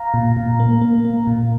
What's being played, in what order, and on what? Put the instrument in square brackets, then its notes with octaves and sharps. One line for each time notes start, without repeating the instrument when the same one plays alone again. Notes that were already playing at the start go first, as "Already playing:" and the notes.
Already playing: [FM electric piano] F5 A#5
A#2
A#2
A#3
A#3
A#3
A#2